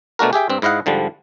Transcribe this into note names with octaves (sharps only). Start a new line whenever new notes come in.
B2 A3 D4 F#4 A#4
G4 G#4 E5 G5
G2 C4
G#2 E4 D#5 F5 F#5
G#2 D3 F3 G3